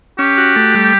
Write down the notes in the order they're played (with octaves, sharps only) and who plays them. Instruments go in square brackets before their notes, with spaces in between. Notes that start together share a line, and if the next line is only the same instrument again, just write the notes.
[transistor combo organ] C#4 [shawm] G4
[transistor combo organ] F#4
A3
G3